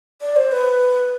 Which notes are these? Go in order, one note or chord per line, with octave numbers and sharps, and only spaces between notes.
D5
C5
B4